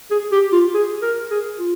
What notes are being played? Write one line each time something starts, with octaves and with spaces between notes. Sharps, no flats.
G#4
G4
F4
G#4
A#4
G#4
F4